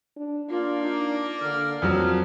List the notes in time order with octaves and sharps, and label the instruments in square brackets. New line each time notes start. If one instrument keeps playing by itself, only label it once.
[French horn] D4
[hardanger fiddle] A#3 D5 [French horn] D4 [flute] F4
[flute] D#4
[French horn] D3 [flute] F6
[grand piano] F2 F#3 [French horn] F3